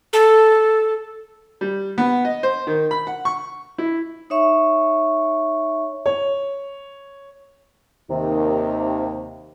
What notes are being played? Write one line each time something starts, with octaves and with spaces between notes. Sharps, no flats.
A4
G3
B3
D#5
C5
D#3
B5
F#5
C#6
E4
D#4 C#5 E5 C#6
C#5
D#2 C3 D#3 D#4